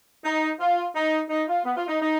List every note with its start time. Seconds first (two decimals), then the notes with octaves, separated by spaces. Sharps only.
0.25 D#4
0.60 F4
0.95 D#4
1.30 D#4
1.48 F4
1.65 B3
1.76 F4
1.88 D#4
2.00 D#4